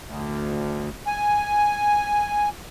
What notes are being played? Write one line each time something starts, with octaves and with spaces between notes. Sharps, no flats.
D2
G#5